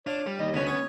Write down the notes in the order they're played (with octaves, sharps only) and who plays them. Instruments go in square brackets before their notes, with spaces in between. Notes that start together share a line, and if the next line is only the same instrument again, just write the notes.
[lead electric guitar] D4 [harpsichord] F4 D6 [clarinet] C#5
[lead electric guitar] G3
[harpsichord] D#2 [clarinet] D#5
[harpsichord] D2 C#3 C#4 [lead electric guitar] B3
[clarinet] C#4 [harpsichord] C#5 C#6 D#6